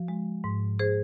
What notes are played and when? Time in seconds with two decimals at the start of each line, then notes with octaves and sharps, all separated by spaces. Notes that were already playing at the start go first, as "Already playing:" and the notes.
Already playing: F3 F#4
0.08 G#3
0.44 G#2
0.79 G#4 C5